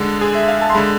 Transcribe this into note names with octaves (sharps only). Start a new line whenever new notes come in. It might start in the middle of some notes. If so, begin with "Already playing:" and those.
Already playing: D3 G#3 A4
G#4
E5
F5
A5
C6
D3 G#3 B5